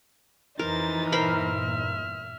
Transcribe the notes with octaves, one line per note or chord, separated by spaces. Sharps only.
F2 E3 D#4 A#4 C5 A6
E2 G2 A#2 A#4 C5 E5 B5 F6